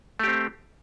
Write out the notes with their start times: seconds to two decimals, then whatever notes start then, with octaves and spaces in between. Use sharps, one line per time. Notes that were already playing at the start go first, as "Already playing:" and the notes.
0.19 A3
0.23 G4
0.27 C4